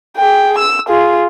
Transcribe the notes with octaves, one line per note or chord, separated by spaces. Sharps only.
G#4 G5
E6
F4 G#4